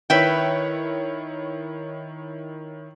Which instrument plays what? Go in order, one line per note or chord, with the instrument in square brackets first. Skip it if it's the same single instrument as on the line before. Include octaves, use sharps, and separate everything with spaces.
[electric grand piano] D#3 E4 C#5 [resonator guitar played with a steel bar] B4 E5 G5